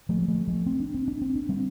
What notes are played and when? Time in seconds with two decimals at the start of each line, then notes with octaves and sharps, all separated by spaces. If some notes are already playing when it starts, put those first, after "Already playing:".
0.09 F3 A3
0.22 G3
0.28 F3 A3
0.47 F3 A3
0.66 C4
0.80 D4
0.94 C4
1.08 D4
1.22 C4
1.35 D4
1.49 G3 C4